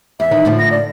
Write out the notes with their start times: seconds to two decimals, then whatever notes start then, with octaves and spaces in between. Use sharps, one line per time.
0.20 E2 E5
0.31 D#3 E3 D#4
0.45 A2 D3 F3
0.59 A#6
0.71 D5